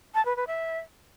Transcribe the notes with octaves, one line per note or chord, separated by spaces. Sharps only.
A5
B4
B4
E5